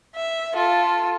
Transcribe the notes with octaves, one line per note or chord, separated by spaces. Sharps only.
E5
F4 A4